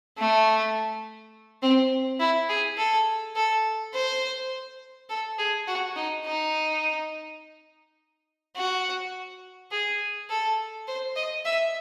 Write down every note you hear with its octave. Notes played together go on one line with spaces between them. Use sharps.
A3
C4
E4
G#4
A4
A4
C5
A4
G#4
F#4
D#4
D#4
F#4
G#4
A4
C5
D#5
E5